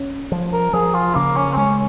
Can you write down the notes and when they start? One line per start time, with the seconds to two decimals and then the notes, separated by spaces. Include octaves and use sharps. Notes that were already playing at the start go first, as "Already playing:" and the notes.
Already playing: C#4
0.32 F3
0.53 A#4
0.73 F3 G#4
0.94 F4
1.15 C#3 A#3
1.36 C#4
1.52 C4
1.56 G#3 C#4